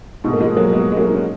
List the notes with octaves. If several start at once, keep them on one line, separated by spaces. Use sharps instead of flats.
G#2 B2
A#3
F3 G#3
F#3 A#3
G#3 B3
G#3
F#3 A#3
D#4
C#4